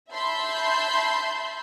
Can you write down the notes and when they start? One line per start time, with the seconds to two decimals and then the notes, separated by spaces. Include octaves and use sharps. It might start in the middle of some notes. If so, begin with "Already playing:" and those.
0.11 E5 A5 B5 C6 G6